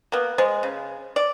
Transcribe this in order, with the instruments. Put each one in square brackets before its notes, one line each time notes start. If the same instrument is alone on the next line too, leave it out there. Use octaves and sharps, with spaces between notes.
[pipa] A#3 B3
[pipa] G#3 [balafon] C5
[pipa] C#3
D5